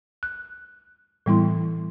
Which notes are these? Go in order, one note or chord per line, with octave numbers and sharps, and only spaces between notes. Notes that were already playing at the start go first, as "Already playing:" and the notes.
F#6
A2 E3 G3 B3 E4 C6